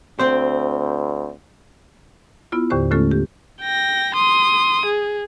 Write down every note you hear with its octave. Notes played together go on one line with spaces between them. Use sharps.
D2 C4 C5
B3 E4 F4
D#2 A2 D3 G4 C5
D3 G#3 A3 C#4 F4 A4
G4
G5 A#6
C6 D#6
G#4